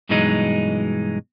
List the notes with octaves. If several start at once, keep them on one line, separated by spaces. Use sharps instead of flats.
G2 B2 E3 F#3 G#3 D#4